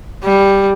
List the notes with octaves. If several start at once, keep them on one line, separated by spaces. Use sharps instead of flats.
G3